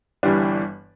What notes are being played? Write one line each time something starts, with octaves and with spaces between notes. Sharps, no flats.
G1 G2 E3 G3 D4